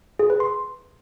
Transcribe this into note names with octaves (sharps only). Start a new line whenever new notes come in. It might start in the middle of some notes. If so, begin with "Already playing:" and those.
G#4
B4
C6